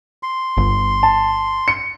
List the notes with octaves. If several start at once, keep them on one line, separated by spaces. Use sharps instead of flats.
C6
G1
A5
C#7